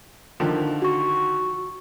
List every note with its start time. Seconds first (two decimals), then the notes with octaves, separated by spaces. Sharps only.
0.40 D3 D#3 F3
0.82 F#4 C#6